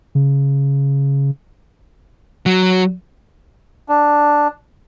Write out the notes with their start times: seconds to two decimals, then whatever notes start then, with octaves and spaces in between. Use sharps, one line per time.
0.15 C#3
2.46 F#3
3.89 D4